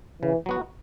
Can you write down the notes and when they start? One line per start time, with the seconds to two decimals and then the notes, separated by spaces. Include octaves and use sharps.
0.22 C#3 E3
0.46 F#3 B3 F#4